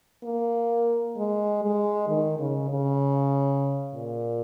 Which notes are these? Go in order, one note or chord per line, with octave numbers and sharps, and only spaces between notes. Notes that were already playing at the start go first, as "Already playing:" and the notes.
A#3
G#3
G#3
D#3
C#3
C#3
A#2